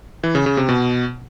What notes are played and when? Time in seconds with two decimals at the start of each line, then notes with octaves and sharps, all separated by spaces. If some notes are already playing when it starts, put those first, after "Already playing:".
0.23 E3
0.35 C#3
0.46 C#3
0.57 C3
0.69 B2